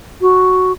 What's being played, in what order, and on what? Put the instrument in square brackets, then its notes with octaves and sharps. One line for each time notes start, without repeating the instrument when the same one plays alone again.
[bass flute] F#4